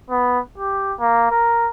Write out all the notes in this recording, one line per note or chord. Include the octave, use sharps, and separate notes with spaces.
B3
G4
A#3
A#4